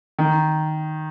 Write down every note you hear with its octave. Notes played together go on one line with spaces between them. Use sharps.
D#3